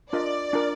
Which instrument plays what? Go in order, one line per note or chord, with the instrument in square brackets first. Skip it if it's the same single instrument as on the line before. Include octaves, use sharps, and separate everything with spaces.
[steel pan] D4 F4 A#4 D#5 [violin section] D5
[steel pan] D4 F4 A#4